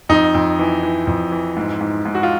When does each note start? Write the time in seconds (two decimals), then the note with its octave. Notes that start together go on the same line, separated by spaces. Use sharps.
0.09 F2 D#4
0.35 F2
0.59 E3
0.83 E3
1.07 F2
1.32 E3
1.57 G#2
1.81 G#2
2.05 G#2
2.15 F#4
2.23 F4